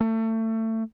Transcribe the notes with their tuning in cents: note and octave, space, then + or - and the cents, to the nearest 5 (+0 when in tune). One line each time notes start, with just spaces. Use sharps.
A3 +25